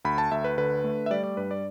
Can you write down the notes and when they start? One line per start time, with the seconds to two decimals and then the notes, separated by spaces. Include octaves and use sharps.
0.05 D2 B5
0.18 A5
0.31 D2 E5
0.44 B4
0.58 D3 B4
0.84 A3
1.06 E5
1.10 G3 D5
1.24 D5
1.37 G2 B4
1.51 D5